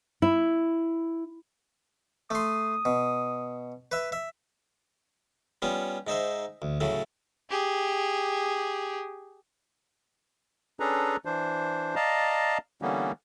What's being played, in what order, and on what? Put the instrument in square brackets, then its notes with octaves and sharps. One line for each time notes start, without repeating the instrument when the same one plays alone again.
[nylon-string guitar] E4
[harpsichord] A3 C6 [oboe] D#6
[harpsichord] B2
B4 E5
E5
G3 B3 C#4 F4
G#2 D#4 C5 E5
D2
A2 C#3 F#3 A3
[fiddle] G4 G#4
[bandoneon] C#4 D4 G#4 A4 B4 A#5
E3 D4 C5
D5 D#5 F5 A5 A#5
D3 E3 G3 A#3 B3 C#4